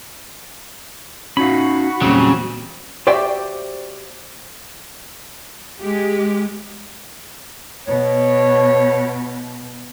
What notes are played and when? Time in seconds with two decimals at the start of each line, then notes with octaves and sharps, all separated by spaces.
1.37 C#4 D#4 F#4 F5 B5
2.02 E2 A#2 C#3 F#3 G3 C4
3.07 F#4 G4 C5 D5 E5 G5
5.81 G#3 G4
7.87 B2 C#5